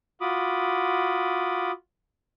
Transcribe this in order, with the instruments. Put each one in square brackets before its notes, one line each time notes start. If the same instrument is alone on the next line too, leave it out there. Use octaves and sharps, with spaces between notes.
[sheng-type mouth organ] F4 F#4 B5 D6 D#6